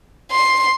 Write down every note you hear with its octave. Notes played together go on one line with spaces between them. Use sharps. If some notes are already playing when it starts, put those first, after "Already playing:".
C6